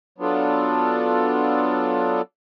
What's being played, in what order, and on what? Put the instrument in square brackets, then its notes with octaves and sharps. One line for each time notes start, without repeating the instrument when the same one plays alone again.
[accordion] F#3 B3 D4 F4 A4